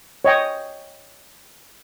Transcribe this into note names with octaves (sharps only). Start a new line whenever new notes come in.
C#5 D#5 G5 D#6